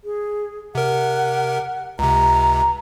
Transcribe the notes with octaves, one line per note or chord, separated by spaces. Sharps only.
G#4
C3 A#4 F#5
C#2 C3 A#5